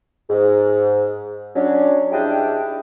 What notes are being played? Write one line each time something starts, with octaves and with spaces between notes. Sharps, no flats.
G#2
F#3 C#4 D4
G#2 G3 D4 E4 D#5 G5